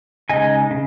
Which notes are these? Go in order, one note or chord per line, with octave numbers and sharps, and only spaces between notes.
C#3 G#3 D#4 D#5 G#5
C#3